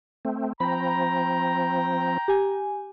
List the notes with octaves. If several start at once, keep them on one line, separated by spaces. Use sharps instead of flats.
A3 C4
F3 C4 G5 A#5 B5
G4 G#5